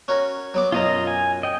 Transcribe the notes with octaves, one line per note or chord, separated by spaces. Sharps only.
C#4 F#4 A#4
F#3 B3 D6
F#2 B2 F4 D#5 A#5
G#5
D#5 G5